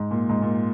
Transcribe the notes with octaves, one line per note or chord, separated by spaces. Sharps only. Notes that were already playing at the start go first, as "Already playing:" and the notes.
Already playing: G#2
A#2
G#2
A#2